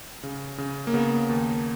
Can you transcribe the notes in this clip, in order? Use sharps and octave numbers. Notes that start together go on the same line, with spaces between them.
C#3
C#3
A#3
C#3 B3
D#2